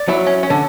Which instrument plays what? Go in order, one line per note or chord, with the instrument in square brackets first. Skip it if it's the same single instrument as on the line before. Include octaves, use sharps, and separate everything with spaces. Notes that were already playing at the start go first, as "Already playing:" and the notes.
Already playing: [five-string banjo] D5
[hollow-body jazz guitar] F#3 [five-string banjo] E4
[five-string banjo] C#4
C#4
[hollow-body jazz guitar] D3